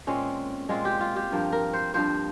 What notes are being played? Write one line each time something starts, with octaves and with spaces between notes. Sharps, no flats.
A#2 G#3 C4 C#4
A#2 G#3 C4 F4
G4
F4
G4
G2 F3 A#3
A#4
C5
G2 F3 A#3 C5